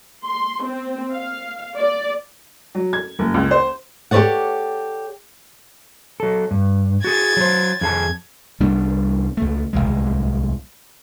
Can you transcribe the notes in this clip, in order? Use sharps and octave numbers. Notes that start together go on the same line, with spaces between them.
C6
C4
F5
D5
F#3
G#6
F#1
C#2
C5
G4 A4 B4 C#5 D5 F#5
F#3 A4
G2
F#4 G#4 G#6 A6
F#3 C5
F2 G#4 A5 G#6
C2 G3 B3 D4
C#2 A3
D1 G1 C2 G#3